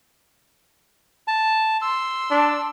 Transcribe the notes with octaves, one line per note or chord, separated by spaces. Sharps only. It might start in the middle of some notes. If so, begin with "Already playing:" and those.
A5
C6 E6
D4